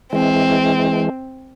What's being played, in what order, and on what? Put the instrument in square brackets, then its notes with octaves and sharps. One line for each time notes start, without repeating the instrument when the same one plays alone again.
[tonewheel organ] E3 G#3 [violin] C4